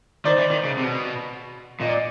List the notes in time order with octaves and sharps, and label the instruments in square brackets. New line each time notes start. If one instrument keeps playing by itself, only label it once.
[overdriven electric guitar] D#3 [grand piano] C5 D5
[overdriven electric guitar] E3
D#3
C#3
C3
B2
[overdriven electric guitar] A#2 [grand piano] D#5
[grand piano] D5